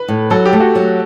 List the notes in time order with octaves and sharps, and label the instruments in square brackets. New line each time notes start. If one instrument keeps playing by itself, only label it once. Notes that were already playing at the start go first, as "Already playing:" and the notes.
Already playing: [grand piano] B4
[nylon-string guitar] A2
[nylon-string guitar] F#3 [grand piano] A4
[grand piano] G4
[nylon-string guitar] A3
[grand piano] F#4
[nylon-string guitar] F#3